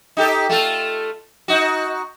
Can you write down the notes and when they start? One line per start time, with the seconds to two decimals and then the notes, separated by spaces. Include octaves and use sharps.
0.17 D#4 G4 A4
0.49 A3 F4 A4
1.48 D#4 F#4